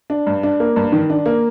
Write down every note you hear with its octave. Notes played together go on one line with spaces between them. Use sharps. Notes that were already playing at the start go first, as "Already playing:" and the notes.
D4
G2
D4
A#3
G2
D#3
D4
A#3